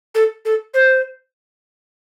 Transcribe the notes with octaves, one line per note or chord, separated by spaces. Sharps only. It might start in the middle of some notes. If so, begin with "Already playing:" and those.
A4
A4
C5